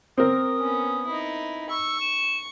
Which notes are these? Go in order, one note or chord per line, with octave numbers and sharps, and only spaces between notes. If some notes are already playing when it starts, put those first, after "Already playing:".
C4 A#4 D#6
B3 C#4
D#4 E4
C#6 E6
E7